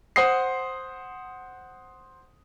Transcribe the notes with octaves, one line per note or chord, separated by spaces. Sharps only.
C5 F#5 C6 D#6 C7